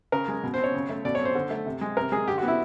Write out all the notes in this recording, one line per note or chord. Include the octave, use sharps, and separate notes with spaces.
C#3 A#4
G#3
B2
C5
C4
C#5
C#3
A3
B2 D5
C#5
C4
C5
D3
A3
C3
G#3
C3 A#4
G#3 G#4
D3 G4
F#4
B3 E4